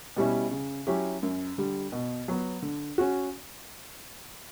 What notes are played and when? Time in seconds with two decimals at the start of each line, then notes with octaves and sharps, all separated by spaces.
0.16 B2 G3 C#4 E4
0.51 C#3
0.87 F#3 C#4 E4 G4
1.23 F#2
1.58 D3 G3
1.92 B2
2.28 F#3 B3
2.62 D3
2.98 C#4 F#4